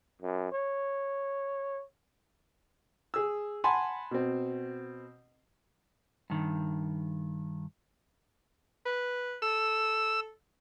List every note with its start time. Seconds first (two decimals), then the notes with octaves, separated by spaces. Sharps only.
0.22 F#2
0.53 C#5
3.14 G#4 E6
3.64 F#5 G#5 A5 B5 C6
4.11 B2 C4
6.30 G2 D#3
8.85 B4
9.42 A4 E6